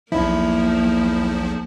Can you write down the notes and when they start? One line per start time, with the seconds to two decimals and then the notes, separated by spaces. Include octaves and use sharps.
0.12 B1 E2 F3 A#3 E4